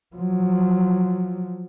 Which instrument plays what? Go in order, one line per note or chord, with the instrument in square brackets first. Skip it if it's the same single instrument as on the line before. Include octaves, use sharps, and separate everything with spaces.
[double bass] F3 F#3